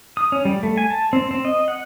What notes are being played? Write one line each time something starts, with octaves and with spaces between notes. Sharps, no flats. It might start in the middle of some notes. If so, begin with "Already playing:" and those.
D#6
C#4
G3
A3
G#5
A5
C4
C4
D#5
F#5